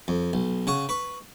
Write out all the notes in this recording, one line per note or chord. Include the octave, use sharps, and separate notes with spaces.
F2
B1
C#3 F#5 C#6
B4 C#6